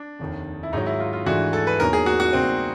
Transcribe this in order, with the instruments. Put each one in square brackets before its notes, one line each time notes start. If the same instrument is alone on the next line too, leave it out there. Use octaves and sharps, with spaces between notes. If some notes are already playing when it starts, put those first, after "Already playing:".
Already playing: [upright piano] D4
[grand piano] F1 D#2 D#3
[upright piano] E4
[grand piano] G#2 D#3 F#3 [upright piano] D#4
[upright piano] E4
F4
F4
[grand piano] G#2 E3 A3 D4 [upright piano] F#4
[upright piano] A4
B4
[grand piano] E2 B2 F#3 A#3 D#4 [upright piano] A#4
[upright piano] G#4
F#4
F#4
[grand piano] C#2 B2 G3 A#3 D#4 [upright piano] C4